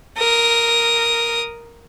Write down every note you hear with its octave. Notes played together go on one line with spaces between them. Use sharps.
A#4 D#6